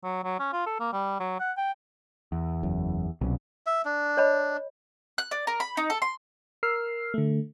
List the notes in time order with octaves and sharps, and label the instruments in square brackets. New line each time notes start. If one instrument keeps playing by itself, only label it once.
[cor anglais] F#3
F#3
C#4
F4
A4
A#3
G3
F#3
F#5
G5
[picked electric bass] E2
[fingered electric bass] F#1 F#2
[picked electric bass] C2 [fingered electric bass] B2 F#3 C#4
[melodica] E5
D4
[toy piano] C#5 D#5 B5
[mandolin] F#6
D5
A#4
B5
D#4
A4
C6
[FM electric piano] A#4 E6 F6 C7
D3 A3